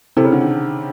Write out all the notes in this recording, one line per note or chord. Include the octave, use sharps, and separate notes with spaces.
C3 C4 E4 A4
C#3
D3
D#3